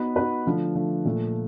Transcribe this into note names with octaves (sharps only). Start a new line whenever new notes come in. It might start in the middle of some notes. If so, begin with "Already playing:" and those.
Already playing: B3 D#4 F#4 B4
B3 D#4 F#4 B4
D3 F3 A3
D3 F3 A3
A#2 F3 A3